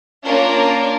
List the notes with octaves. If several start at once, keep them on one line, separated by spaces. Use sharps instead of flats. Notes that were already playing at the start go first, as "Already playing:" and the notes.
A#3 C#4 D4 F4 A#4